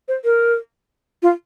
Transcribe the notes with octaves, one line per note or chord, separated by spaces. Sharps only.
C5
A#4
F4